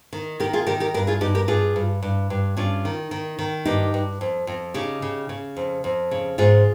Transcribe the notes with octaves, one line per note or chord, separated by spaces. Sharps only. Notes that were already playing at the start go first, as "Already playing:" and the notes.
D#3
D#3 G4 A#4
F4 G#4
D#3 G4 A#4
G4 A#4
G2 G4 A#4
F4 G#4
G2 D#4 G4
G4 A#4
G2 F4 G#4
G2
G2
G2
G2 C#4 F4
D#3
D#3
D#3
G2 D#4 G4
G2
F2
F2
C#3 D#4 G4
C#3
C#3
F2
F2
C#3
G#2 F4 G#4